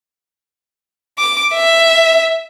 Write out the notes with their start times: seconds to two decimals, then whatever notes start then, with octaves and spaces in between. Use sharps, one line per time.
1.19 D6
1.53 E5